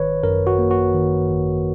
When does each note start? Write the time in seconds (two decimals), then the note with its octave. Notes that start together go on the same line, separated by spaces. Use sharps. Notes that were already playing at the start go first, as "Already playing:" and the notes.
Already playing: G#1 D#3 B4 C#5
0.23 F#2 A#4
0.47 F#4
0.59 A#3
0.71 F#4
0.94 D#3
1.30 G#1